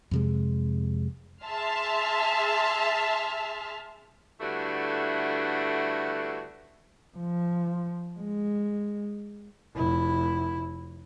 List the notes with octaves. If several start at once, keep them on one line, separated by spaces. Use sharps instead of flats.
F2 C3 G#3
G#4 E5 A5 C6 F6
G2 D3 A3 E4 F#4
F3
G#3
F1 E4